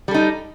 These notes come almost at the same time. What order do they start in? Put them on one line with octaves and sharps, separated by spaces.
G3 A4 D#4